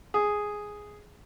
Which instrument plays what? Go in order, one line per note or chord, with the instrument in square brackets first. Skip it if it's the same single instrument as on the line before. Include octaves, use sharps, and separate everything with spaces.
[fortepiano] G#4